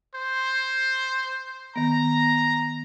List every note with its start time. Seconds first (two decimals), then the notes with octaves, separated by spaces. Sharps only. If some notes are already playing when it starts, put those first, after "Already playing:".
0.15 C5
1.76 D#3 B3 A#5